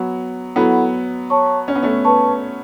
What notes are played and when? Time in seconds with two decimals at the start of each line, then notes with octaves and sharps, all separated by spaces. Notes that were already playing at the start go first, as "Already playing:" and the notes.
Already playing: F#3 B3
0.56 F#3 B3 E4 A4 F#5 B5
1.30 C#5 A5 C#6
1.68 C#4
1.75 B3
1.83 A3 C#4
2.05 B4 A5 C#6